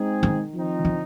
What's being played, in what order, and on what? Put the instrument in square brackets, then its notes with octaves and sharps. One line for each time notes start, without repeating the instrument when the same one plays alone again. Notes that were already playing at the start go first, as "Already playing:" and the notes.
Already playing: [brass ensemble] G#3 C4 D#4 G#4
[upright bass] D#3
[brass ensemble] F3 C4 D#4
[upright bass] D3